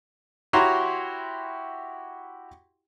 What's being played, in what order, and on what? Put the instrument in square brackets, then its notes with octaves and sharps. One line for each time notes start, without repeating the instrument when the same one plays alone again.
[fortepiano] E4 F#4 G4 C#5 A#5 C6